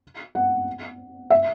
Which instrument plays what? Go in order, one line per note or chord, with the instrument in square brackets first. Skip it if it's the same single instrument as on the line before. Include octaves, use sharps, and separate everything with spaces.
[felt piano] F#5
E5